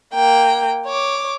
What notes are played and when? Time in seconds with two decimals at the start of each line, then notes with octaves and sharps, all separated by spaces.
0.14 A#3 G5
0.86 C#5 D6